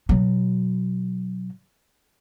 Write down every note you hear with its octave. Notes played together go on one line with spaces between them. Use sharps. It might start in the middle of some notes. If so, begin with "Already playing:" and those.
B2 F#3